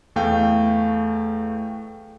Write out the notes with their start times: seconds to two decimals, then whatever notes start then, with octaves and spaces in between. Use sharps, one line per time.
0.16 E2 A3 F5 G5